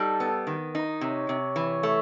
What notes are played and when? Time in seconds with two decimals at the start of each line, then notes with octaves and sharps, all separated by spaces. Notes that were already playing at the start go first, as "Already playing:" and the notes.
Already playing: G3 D#4 A4
0.20 B3
0.47 D#3
0.75 D#4
1.01 C3 C#5
1.29 C3
1.56 E3
1.83 A3